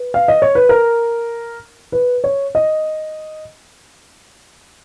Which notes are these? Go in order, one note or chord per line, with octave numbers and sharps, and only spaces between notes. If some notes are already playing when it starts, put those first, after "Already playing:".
Already playing: B4
F5
D#5
C#5
B4
A#4
B4
C#5
D#5